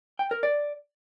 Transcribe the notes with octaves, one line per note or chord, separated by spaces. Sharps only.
G5
A#4
D5